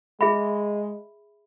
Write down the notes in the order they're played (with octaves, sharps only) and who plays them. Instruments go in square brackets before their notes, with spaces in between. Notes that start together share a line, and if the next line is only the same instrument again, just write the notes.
[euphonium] G#3 [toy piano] G#4 E5 B5